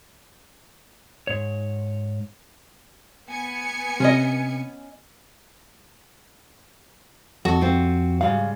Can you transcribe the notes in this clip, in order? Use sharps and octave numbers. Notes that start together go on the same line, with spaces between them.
G#2 C#5
B3 G#5 C#7
C3 C#4 D#5
F2 F#4 A4
C4 F4
G#2 C#3 G3 F5